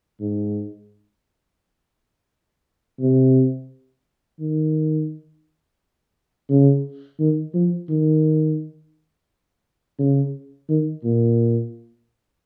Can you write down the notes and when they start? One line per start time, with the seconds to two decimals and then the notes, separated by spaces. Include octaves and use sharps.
0.20 G#2
3.00 C3
4.40 D#3
6.50 C#3
7.20 D#3
7.54 F3
7.89 D#3
9.99 C#3
10.69 D#3
11.04 A#2